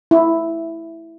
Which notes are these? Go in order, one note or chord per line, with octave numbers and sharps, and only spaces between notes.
E4